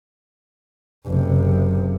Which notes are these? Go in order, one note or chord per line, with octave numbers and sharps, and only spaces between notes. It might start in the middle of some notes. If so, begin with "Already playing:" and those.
F#1 C3